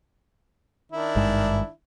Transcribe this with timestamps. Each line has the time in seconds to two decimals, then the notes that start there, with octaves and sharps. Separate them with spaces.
0.92 D#3 D4 E4
1.16 G#1 G2 G#3